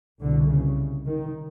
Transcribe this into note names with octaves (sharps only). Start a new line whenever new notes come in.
C2 B2 D3
C#3
D#3